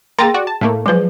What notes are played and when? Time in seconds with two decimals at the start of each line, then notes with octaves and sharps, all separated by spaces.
0.19 A#3 G#4 G5 A#5 C6 A6
0.34 F#4 D5
0.47 A5
0.61 A2 A3 A#3
0.86 F3 F#3 G#3 B4